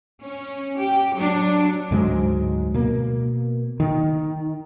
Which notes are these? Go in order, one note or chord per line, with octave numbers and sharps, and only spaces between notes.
C#4
G4
F#3 D4
D2 G#2 F#3 G#3
B2 A#3
D#3